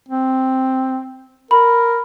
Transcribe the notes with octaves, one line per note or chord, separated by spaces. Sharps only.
C4
A#4 B5